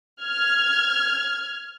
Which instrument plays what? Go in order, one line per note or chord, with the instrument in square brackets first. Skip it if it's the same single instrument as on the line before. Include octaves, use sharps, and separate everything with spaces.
[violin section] F6 G#6